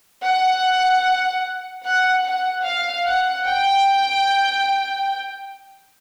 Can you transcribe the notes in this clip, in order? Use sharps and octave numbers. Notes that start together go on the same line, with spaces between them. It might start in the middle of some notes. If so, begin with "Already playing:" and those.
F#5
F#5
F#5
F5
F#5
G5